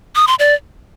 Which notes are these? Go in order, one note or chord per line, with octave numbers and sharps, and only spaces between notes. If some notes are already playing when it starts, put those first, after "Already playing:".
D#6
C6
D5